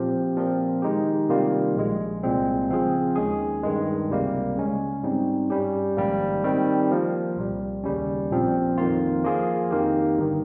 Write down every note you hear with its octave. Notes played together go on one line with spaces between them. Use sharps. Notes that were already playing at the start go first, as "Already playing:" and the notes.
Already playing: A#2 F3 C4 G4
A#2 F3 C4 F4 A#4
D#3 G#3 D#4 G4
C3 D#3 G3 A#3 F4
A#1 A#2 G#3
C2 A#2 G#3 C4
C#3 F3 C4 F4 G#4
D#2 D#3 G#3 C#4 G#4
G2 D#3 G#3
C#2 C3 G3 A#3
C#3 G#3 C#4
G#2 G3 C4 D#4
G2 G3 C#4 G4
A#1 G#2 D#3 G3 A#3
D#3 G3 C4
F3 A#3 F4
C2 A#2 G3
D#2 C#3 G3 C#4
A#1 A#2 F3 C4
F2 D#3 A#3 F4
F3 A#3 F4 G#4
F2 D#3 A#3 D#4 G4
G1 G2 D#3